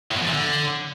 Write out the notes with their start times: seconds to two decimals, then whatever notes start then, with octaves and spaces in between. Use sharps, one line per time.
0.11 A2
0.16 B2
0.21 E2
0.27 A#2
0.32 D3